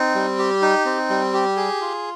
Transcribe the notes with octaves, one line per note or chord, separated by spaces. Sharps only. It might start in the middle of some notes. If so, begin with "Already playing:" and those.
Already playing: C4 D#4
G3
G4
D#4
C4
G3
G4
G#4
F4